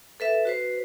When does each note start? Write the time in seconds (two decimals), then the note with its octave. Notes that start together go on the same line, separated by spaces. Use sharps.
0.20 A4 B4 E5
0.45 F#4 B4 C5